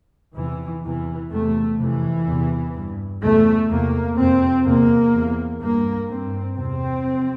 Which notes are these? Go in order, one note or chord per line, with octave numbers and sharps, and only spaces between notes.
E2 C3 E3
E2 C3 E3
E2 C3 A3
F2 C3 E3
E2 C3
G2
E2 C3 A3
E2 C3 A#3
F2 C3 C4
E2 C3 A#3
E2 C3
G2 A#3
G2 C4
E2 C3 C4
F2 C3